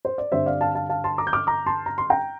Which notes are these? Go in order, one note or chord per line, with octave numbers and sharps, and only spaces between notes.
C5
D5
G2 D3 G3 C4 C5 E5
D5 F5
F5 A5
F5 A5
F5 A5
A5 C6
A#5 D6
G6
D6 F6
A#5 D6
A5 C6
A#5
C6
G5 A#5